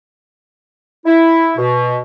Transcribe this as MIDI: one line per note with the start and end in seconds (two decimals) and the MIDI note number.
1.06 1.52 64
1.57 2.00 47